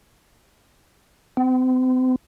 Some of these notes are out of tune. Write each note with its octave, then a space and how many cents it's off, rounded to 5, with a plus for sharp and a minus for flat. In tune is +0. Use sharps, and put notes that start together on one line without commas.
C4 -40